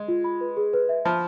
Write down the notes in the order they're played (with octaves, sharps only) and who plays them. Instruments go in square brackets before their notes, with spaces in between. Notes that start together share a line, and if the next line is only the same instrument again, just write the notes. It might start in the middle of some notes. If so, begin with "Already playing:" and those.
Already playing: [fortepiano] G#3
[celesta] F4
B5
B4
G#4
B4
E5
[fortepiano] F3 [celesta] B5